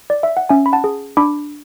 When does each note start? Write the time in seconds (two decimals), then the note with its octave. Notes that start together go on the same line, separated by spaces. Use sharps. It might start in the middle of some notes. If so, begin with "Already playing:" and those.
0.10 D5
0.23 E5
0.37 F#5
0.49 C#4 E5 G#5
0.66 B5
0.73 F#5 A5
0.84 G#4
1.17 D4 B5 D6